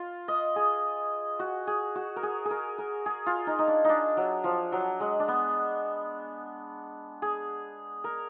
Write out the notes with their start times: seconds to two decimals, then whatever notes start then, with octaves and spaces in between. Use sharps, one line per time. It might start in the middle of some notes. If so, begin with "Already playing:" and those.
Already playing: F4
0.28 D#5
0.56 G#4
1.39 F#4
1.67 G#4
1.95 F#4
2.16 A#4
2.23 G#4
2.45 G#4
2.50 A#4
2.78 A#4
3.06 G#4
3.26 F4
3.47 D#4
3.59 D#4
3.68 D4
3.84 D4 D#4
4.17 F#3
4.44 F3
4.72 F#3
5.00 G#3
5.20 D4
5.28 B3
7.22 G#4
8.04 A#4